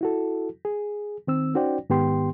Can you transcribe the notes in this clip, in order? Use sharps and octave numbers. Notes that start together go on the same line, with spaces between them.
E4 F#4 A4
G#4
D#3 C4 E6
C#4 D#4 F#4 C5 D5 G5
G#2 D#3 B3 G4 G5 C6